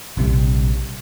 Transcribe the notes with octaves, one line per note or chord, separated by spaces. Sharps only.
A#1 C3 E3 G3